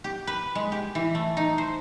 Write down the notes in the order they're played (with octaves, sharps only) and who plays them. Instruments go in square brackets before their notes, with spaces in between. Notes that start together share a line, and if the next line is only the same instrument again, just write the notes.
[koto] G4
B4
G#3
G4
E3
A3
D#4
C5